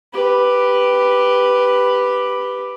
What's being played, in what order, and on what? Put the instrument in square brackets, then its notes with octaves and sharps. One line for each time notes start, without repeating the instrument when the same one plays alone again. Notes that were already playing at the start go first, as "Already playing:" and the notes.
[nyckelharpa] G4 B4